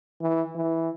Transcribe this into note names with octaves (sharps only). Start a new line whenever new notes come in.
E3
E3